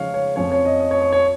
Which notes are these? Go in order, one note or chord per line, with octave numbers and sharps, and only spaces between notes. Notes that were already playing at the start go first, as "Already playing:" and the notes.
Already playing: C#3 F3 G#3 D#4 C#5 F5
C#5
F2 F3 C#4 C#5
C#5
D#5
D#5
C#5
C#5
C#5